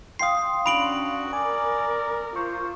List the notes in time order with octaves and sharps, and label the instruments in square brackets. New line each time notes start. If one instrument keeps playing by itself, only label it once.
[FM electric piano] F5 G5 C6 [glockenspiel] D#6 C7
[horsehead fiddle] C#4 D4 [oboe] F#4 [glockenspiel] B5 D7 F#7
[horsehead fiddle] A#4 [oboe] D5 [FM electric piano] G#5
[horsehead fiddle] F4 [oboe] C5 [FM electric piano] C#6